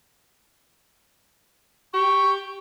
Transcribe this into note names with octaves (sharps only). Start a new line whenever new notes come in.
G4 C#6